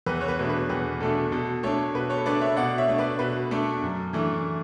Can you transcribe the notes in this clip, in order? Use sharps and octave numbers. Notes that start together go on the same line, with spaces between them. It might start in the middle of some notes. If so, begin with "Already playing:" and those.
E2 B4
C#5
B4
B2 A3 D4
B4
E2 B4
B2 A3 D4 A4
B2 A4
A3 D4 A4 C#5
B2 B4
A4 C#5
A3 D4 B4 D5
C#5 E5
B2 D5 F#5
C#5 E5
A3 D4
B4 D5
B2 B4
A3 D4 A4
F#2
E3 A3 D4